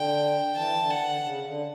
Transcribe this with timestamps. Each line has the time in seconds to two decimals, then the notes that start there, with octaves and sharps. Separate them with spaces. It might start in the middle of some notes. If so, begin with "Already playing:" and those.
Already playing: D3 G5
0.56 E3 A5
0.78 D3
0.90 F#5
1.01 D3
1.23 C#3
1.46 D3